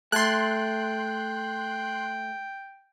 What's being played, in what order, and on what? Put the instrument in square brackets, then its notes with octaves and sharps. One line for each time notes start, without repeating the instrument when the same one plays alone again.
[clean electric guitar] A3 [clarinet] G5 [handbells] A5 G#6 A6 [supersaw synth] C6 F#6